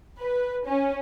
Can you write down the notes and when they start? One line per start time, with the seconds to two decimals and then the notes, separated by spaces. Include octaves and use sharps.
0.21 B4
0.67 C#4